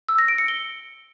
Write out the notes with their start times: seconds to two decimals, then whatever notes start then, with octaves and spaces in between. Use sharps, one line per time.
0.09 E6
0.18 A#6
0.28 D7
0.38 C#7
0.48 G7